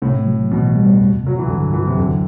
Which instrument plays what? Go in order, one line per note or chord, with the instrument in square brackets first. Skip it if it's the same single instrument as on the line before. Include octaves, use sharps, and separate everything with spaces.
[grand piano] A2 [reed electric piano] C3
[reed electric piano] F#3
[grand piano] B2 [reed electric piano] E3
[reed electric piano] G3
E2
[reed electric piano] C3 [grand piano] F#3
[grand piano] E3
[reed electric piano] G2 [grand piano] D3
[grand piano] E3 [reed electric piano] F#3
[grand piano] C3
[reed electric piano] E2 [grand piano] D3